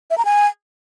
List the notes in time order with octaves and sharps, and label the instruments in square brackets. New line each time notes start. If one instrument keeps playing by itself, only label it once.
[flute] E5
A#5
G#5